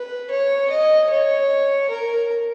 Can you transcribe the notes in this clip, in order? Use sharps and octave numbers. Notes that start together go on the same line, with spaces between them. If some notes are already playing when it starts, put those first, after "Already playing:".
Already playing: B4
C#5
D#5
C#5
A#4